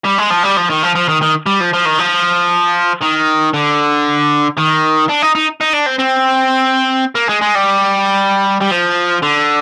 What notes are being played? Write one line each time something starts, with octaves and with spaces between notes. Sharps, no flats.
G3
G#3
F3
G3
F3
D#3
F3
F3
D#3
D#3
G3
F3
F3
D#3
F3
D#3
D3
D#3
D4
D#4
D#4
D#4
D4
C4
C4
A#3
G#3
G#3
G3
G3
F3
D3